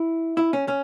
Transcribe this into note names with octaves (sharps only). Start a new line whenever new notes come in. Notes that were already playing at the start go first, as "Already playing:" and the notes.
Already playing: E4
E4
C#4
C#4